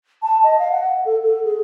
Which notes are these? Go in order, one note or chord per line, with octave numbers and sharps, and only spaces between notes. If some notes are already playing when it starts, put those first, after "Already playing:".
A5
D#5
F5
F#5
A4
A4
G#4